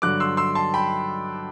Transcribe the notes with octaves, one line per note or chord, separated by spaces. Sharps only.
G2 D3 F#3 D6 F#6
C6 E6
C6 E6
A5 C6
G5 B5